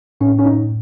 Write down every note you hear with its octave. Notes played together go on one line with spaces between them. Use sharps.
A2 C#4
C#4
D#4